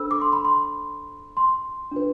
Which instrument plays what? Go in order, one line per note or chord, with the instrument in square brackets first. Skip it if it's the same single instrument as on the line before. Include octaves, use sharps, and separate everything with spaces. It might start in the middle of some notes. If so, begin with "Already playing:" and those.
Already playing: [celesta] D4 A4 C5 B5 E6
D6
C6
B5
C6
C6
D4 F4 B4